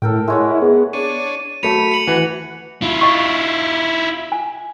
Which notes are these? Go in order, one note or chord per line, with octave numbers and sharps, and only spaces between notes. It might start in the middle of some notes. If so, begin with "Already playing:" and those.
A2 A4 A#4 G5
G#3 E4 C#5 F#5
B3 G#4
D4 C#5 D#7
F#3 A3 B5 C#7 D#7 F7
C#7 F#7
E3 F#4
E4 F4
D#5 C#6
G#5